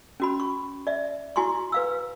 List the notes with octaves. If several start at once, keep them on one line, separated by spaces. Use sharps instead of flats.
C#4 F#4 B5
C#6
D5 E5
E4 F#4 G#5 C6 C#6
B4 F5 E6